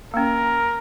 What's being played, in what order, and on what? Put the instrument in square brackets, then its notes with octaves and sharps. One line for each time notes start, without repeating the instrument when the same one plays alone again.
[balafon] A#3 C#4 [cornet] A#4